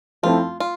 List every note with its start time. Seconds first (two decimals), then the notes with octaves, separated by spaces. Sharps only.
0.23 F3 A3 C4 E4 F4
0.60 F4